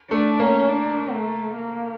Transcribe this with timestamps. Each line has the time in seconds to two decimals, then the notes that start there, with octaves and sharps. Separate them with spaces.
0.11 A3 D4
0.40 A#3 C#4
0.68 D4
1.12 A3
1.56 A#3